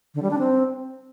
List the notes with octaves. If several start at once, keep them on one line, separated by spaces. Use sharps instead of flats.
D3
G3
D4
C4